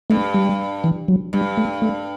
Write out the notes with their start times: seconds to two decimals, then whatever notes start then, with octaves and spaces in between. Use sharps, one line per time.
0.10 G2 A3
0.34 G3
0.84 E3
1.08 F#3
1.33 G2 G3
1.57 A3
1.82 A3